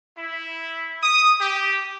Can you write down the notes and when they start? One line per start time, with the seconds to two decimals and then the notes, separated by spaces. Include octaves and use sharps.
0.18 E4
1.03 D#6
1.40 G4